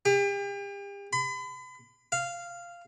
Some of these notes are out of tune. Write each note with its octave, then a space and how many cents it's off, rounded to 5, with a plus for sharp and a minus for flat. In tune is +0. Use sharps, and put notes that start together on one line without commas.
G4 +40
B5 +40
F5 -10